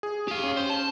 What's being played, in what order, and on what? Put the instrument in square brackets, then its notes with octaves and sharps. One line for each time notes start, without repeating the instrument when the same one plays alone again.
[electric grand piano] G#4
[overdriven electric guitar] G4 F5
[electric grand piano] C#4
[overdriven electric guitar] C5
A5